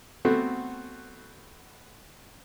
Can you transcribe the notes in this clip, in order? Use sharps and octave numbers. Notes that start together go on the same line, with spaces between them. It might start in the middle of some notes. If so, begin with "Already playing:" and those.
A3 B3 C4 F#4